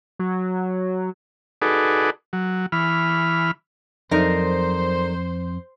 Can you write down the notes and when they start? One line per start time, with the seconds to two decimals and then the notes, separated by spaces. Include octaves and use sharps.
0.19 F#3
1.62 D#4 F#4 G#4 A4 B4 D5
2.33 F#3
2.72 E3 B5 F6
4.11 F2 F#3 D#4 A4 A#4 C5 D5